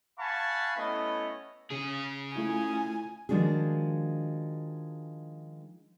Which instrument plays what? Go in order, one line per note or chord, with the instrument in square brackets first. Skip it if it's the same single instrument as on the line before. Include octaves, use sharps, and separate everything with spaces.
[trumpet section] F5 F#5 G#5 A5 B5 C#6
A3 B3 C#4 E4 D#5 B5
[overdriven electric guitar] C#3 G#4
[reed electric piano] A3 E4 F4 [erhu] G#5
[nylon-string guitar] D#3 F3 G#3 D4 F#4 G#4